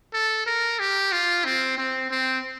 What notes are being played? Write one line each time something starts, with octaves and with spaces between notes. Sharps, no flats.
A4
A#4
G4
F4
C4
C4
C4